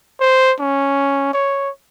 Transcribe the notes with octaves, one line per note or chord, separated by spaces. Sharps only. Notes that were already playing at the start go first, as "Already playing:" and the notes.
C5
C#4
C#5